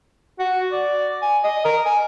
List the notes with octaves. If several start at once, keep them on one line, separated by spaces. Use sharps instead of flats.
F#4
D5
G#5
D#5
A#4
G#5